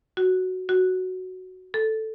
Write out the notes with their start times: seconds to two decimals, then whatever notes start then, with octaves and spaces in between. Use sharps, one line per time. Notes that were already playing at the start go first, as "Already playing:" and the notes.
0.17 F#4
0.69 F#4
1.74 A4